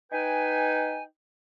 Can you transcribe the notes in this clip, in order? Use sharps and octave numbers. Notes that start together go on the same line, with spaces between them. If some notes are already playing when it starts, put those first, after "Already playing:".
D#4 B4 G5 G#5